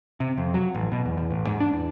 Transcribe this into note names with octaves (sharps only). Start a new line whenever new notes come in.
C3
F2
F#3
A1
B2
E2
E2
A1
G#2
D4
E2